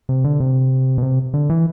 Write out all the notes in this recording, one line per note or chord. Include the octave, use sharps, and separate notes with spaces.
C3
D3
C3
B2
C3
D3
E3